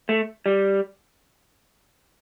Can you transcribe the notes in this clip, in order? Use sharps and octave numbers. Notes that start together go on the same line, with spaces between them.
A3
G3